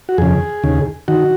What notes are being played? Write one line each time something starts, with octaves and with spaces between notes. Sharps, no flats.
F#4
F2 C#3 G#4
D#2 C#3
D#3 F#4